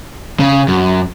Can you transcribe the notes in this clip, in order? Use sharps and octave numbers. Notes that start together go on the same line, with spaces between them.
C#3
F#2